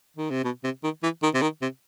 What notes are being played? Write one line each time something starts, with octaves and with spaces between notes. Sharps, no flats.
D#3
C3
B2
C3
D#3
E3
D#3
C3
D#3
C3